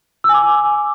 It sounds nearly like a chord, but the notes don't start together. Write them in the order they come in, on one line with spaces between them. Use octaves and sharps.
E6 G#5 D6